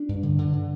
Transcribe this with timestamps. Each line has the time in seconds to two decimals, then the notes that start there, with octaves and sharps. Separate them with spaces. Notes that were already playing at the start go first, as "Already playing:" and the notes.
Already playing: D4
0.09 G2
0.23 D3
0.38 D3
0.53 D3